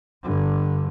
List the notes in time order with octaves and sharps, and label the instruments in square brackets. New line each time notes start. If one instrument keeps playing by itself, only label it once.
[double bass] G2 D3